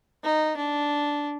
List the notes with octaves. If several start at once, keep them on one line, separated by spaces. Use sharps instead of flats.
D#4
D4